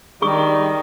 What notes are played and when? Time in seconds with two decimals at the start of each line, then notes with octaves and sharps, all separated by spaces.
0.22 D#3 G3 G#4 C#6 D#6